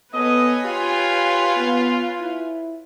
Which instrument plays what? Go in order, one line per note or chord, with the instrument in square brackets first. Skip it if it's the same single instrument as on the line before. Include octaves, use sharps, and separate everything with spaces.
[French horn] B3 [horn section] A4 D#5 [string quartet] B4 C#5 G#5
[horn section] F4 [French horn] G4
[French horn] B3
E4